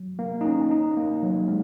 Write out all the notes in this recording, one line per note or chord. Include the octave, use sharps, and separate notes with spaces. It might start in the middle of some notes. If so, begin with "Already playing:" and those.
Already playing: F#3
A#3
D#4
C#4
D#4
A#3
F#3
G#3